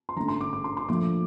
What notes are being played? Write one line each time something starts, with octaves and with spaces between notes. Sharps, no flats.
C6
A1 G2 D3 A3 A#5
C6
D6
D6
C6
C6
A#1 A#2 F3 A3 D6